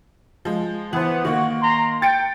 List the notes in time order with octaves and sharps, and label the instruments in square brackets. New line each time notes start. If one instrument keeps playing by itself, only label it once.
[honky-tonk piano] F3 G#3
[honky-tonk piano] E3 C5 [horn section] B3
[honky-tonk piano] D#3 A#3 [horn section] F#4
[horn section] A#5 C6
[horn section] G5 [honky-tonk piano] A6 C#7 D7